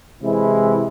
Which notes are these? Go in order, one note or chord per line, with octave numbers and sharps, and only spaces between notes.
C3 E3 G#3 E4